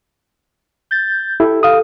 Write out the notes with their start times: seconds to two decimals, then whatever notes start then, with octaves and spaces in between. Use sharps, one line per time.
0.91 G6 A6
1.40 E4 G4 A4
1.63 F5 D#6